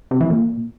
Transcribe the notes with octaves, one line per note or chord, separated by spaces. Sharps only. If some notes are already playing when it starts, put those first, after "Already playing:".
C3
E3
A#2